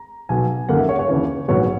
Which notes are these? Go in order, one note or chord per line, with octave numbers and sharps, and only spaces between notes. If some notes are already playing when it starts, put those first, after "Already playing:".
Already playing: A#5
B1 B2 F#3 B3 G#5
F#2 D#3 A#3 F#5
E5
C#5
C#5
D#2 C#3 E3
A#1 G#2 F#3 B3 C#5